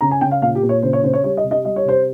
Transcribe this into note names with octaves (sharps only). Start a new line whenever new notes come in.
C#3 A#5
G#5
C#3 G5
F5
A#2 F5
G4
A#2
C#5
C#3 C5
C#5
C#3 C5
C#5
G3 C#5
D#5
C3
D#5
G3 D#5
C#5
C3 C5